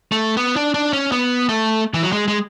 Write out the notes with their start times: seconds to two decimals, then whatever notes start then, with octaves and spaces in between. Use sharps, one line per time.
0.12 A3
0.37 B3
0.56 D4
0.74 D4
0.93 C#4
1.12 B3
1.49 A3
1.94 E3
2.03 F#3
2.12 G#3
2.28 G#3